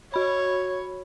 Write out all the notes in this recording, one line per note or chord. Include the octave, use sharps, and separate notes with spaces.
F#4 C#5 B5